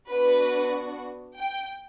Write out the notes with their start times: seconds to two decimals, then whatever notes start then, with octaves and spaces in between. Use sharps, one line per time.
0.10 B3 D4 F#4 B4
1.40 G5